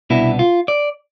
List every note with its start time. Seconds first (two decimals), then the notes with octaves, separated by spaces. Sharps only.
0.10 C2 B2 B3 D4 E4
0.39 F4
0.68 D5